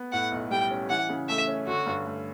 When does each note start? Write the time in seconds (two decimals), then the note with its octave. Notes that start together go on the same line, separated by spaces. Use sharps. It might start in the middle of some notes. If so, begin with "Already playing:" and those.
Already playing: B3
0.12 A2 F#5
0.32 B1
0.51 G3 G5
0.71 C#4
0.89 E3 F#5
1.09 C#3
1.28 A3 E5
1.47 C#4
1.67 D3 F#4
1.86 G2
2.06 A3